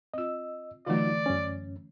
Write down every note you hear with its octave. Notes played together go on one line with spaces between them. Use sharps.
C4 F4 D#5 E6
D3 E3 F#3 A3 D#4 F4 D5
F#2 C#4